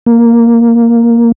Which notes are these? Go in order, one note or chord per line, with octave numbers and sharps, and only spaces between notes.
A#3